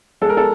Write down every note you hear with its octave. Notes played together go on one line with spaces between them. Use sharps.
G#3 A4
A#4
A4